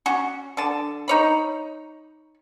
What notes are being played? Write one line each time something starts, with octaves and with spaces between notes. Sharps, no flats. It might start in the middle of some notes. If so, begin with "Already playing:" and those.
C#4 F#4
D3 A5
D#4 C#5 B5